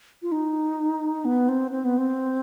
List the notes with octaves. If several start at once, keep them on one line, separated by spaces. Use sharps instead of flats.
F4
D#4
B3
C4
C4
B3
C4